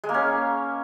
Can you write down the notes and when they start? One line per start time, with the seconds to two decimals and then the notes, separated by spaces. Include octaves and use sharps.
0.04 G#3
0.09 A#3
0.14 C#4